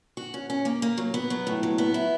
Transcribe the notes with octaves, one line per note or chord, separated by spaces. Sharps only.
F#4
C#4
C#4
A#3
A#3
F#3
B3
F#3
A2
F#3
B3
E4